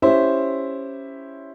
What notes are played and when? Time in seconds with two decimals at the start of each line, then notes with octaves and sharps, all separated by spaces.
0.02 C#4 E4 G4 C5 E5